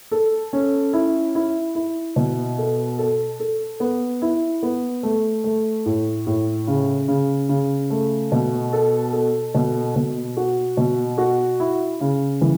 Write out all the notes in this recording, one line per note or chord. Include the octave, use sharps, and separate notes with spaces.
A4
C#4
E4
E4
E4
B2
A4
A4
A4
B3
E4
B3
A3
A3
A2
A2
C#3
C#3
C#3
A3
B2
A4
A4
B2
B2
F#4
B2
F#4
E4
C#3
E3